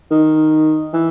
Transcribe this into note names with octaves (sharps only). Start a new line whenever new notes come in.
D#3
E3